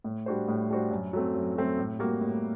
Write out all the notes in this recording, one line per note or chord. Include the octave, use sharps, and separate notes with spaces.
A2
G3 D4 F#4 C5
A2
G3 D4 F#4 C5
F#2
F#3 A3 C4
F#2
F#3 A3 C4
A2
G3 A#3 F#4
A2